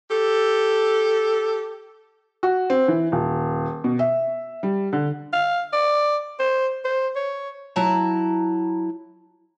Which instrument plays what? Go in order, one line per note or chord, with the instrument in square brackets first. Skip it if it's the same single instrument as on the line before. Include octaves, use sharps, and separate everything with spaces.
[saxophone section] G4 A4
[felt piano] F#4
C4
E3
D#1
B2
E5
G3
D3
[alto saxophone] F5
D5
C5
C5
C#5
[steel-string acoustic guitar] F#3 E4 A5 A#5